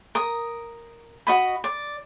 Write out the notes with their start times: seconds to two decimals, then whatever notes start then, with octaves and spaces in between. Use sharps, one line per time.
0.15 A#4 D#6
1.27 F#4 D#5 B5
1.64 D5